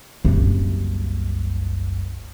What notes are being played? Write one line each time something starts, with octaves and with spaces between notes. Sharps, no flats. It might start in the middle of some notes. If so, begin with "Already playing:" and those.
F#1 C2